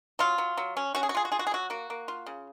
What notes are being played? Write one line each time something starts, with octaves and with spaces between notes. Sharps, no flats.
F#3 F4
F#3
F#3
C#4
C#4 F#4
G#4
F#4
F4 G#4
F#4
F4 G#4
F#4
G#4
F#3 F#4
A#3 F#4
A#3
F4
C#3